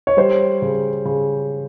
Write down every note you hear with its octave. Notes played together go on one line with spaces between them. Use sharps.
C#5
G3 C5
C#3
C#3